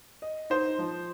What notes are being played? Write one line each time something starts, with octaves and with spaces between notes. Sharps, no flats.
D#5
D#4 C5
F3